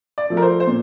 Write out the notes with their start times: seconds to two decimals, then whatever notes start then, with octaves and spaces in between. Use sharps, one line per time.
0.18 D5
0.30 F3 A3
0.37 A#4
0.42 C5
0.60 C5
0.67 A#2